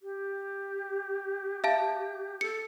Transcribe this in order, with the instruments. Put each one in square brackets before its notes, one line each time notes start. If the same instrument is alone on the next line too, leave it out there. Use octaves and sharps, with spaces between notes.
[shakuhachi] G4
[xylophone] E5 F5 A5
[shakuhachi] A4 [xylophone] C#7